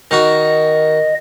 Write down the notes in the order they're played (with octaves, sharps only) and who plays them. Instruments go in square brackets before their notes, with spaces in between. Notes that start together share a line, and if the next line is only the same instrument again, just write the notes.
[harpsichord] D#3 F#4 [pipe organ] D#5